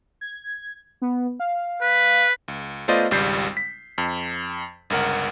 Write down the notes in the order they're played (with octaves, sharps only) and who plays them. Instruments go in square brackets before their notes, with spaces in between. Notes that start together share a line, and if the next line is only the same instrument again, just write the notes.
[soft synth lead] G#6
B3
F5
[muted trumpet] B4
[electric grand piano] C#2
A3 B3 F4 C5 D5 D#5
G#1 C#2 G3 G6 C7
B6
F2
G1 C#2 A#4 F#5